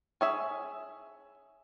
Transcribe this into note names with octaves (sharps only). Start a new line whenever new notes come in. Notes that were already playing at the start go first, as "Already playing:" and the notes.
C#4 G#4 E5